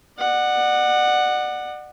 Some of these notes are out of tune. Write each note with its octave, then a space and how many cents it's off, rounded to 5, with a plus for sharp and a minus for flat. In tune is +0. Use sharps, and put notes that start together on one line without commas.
D5 +40 F#5 +0